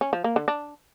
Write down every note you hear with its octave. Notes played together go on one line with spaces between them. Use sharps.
C#4
F3
A#3
D3
D4